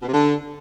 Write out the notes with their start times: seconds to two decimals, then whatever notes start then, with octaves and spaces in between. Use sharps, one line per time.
0.02 B2
0.07 C3
0.12 D3